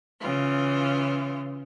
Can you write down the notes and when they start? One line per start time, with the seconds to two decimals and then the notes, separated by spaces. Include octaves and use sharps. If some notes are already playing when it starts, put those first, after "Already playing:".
0.19 C#3 E3 F4